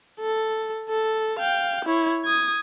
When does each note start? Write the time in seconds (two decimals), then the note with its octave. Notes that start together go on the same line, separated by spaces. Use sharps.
0.20 A4
0.89 A4
1.39 F5 G5
1.85 E4 C#5
2.25 D#6 G#6